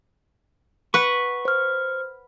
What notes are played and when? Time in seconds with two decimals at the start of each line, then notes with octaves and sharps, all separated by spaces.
0.94 B4 F#5 C#6
1.45 C5 F6